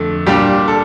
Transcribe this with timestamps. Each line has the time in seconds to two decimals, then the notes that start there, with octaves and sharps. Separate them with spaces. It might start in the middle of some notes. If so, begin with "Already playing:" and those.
Already playing: F2 D3 A3
0.27 A#2 G3 D4 G4
0.68 A4